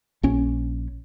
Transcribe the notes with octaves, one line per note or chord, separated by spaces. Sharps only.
A#1 C#4